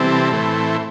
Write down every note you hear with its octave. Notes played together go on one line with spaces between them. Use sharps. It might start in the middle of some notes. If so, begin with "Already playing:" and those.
Already playing: C3 E3 G3 C4 A4
A2 E3 A3 C4